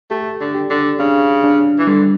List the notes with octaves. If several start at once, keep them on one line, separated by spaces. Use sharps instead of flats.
A3 G4
D3
G4
D3
C#3 D4
D4
E3
D3 G3